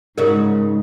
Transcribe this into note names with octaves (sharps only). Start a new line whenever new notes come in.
G#2 C#3 D#4 F#4 A#4